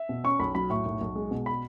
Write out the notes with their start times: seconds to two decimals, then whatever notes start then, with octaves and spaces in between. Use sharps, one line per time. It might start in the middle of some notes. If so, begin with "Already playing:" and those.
Already playing: E5
0.09 B2
0.24 C#4 C#6
0.39 B1 B5
0.55 F#3 B5
0.70 A2 C#6
0.86 B1
1.01 B1
1.15 G#3
1.31 B2
1.46 B5